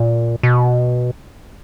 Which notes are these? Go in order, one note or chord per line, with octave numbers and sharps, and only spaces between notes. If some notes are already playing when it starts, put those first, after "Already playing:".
Already playing: A#2
B2